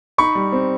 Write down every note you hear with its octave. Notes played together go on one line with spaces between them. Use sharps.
D#4 B5 C#6
G3
C4